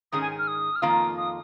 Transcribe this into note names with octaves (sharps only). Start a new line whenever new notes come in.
G#2 D#3 C#4 G#4 D#6
G#5
F6
D#6
F6
F2 D#3 A#3 F4 D#6
D#6